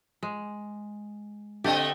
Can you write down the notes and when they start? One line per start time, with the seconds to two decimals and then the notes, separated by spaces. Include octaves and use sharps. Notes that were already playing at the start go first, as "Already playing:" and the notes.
0.23 G#3
1.64 D3 A3 C4 G4 D#5